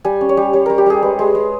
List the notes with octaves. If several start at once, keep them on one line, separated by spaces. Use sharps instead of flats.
G3 G#5
C#4
C#5
G3
G3 C#5
G3 A#4
G4
G3 G#4
G#3 B4
G#3
G#3